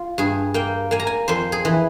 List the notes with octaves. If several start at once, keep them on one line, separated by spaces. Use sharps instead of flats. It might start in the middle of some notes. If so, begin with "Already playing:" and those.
Already playing: F4
G2 G#4
A#3 G5
A#3 G#5
A#5
G#5
F2 C5
G#4
E3